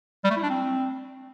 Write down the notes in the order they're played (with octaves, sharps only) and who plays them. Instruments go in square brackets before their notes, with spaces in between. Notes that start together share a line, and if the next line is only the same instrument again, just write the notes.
[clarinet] G3
A3
E4
D4
C4